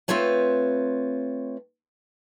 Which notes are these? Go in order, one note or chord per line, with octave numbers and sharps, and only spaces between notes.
A3 C4 F4 B4 C#5 A5